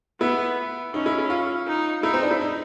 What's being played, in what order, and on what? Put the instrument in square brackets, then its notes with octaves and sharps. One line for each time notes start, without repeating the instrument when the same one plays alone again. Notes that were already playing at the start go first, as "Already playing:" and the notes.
[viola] B3 [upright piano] E4
[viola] C#4 [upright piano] D#4
[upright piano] E4
E4
F4
[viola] D#4
[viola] D#4 [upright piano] E4
[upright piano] C4
D4
E4
D#4